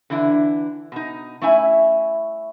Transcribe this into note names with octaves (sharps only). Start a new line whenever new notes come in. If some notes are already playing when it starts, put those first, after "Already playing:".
D3 E3 D4 E4
B2 D#4
A3 C#4 E4 E5 G#5